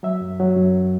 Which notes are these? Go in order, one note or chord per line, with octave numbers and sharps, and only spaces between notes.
F#3 E5
F#2
F#3
F#2